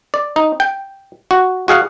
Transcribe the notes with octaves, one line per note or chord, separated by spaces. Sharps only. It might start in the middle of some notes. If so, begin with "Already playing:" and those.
D5
D#4
G5
F#4
F#4 G#4 F5 F#5